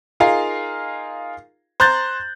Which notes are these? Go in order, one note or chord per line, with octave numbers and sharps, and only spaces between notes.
D#4 F4 G#4 A#4 F5
C5 A#5 F#6 G6 A6